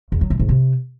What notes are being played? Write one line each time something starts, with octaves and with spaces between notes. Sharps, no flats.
E2
F#3
F#2
G#2
C3